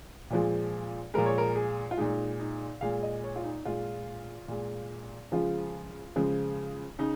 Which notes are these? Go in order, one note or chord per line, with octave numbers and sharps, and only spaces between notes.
A#2 F3 G#3
A#2 F3 G#3 A#4
C#5
A#4
G#4
F4
A#2 G#3 D#4
D#4
A#2 G#3 F5
D#5
C#5
F4
D#4
A#2 G#3 F4
A#2 G#3
C#3 F3 G#3 F4
C#3 F3 G#3
C#3 D#4